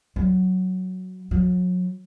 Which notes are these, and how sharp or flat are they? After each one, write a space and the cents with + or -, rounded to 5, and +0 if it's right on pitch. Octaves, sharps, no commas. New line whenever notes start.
F#3 +0
F#3 -35